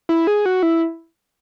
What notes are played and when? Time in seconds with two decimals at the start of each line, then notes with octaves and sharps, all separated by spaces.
0.09 E4
0.27 G#4
0.46 F#4
0.63 E4